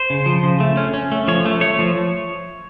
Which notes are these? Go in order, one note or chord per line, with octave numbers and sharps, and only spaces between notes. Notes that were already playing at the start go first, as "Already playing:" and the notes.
Already playing: C5
C#3
F3
C#3
A3
C#4
C#4
A3
F3 C#5
A3
A3 C#5
F3